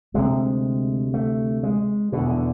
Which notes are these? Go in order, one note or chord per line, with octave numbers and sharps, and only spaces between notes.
D2 C3 G#3
A3
G#3
E2 B2 D3
D3